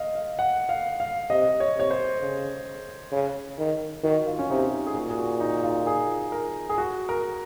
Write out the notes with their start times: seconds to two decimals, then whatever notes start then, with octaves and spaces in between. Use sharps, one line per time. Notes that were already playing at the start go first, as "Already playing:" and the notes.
Already playing: D#5 F5
0.15 F5
0.39 F#5
0.69 F5
1.00 F5
1.30 C3 D#5
1.60 C#5
1.76 C3 C#5
1.91 C5
2.21 C#3
3.12 C#3
3.59 D#3
4.04 D#3 F#4
4.27 F4
4.39 C#4
4.50 C3 D#4
4.86 G#4
4.95 A#2 F#4
5.09 G#4
5.18 F#4
5.40 D#4
5.64 F4
5.87 G#4
6.32 A#4
6.69 G#4
6.78 F#4
7.09 A#4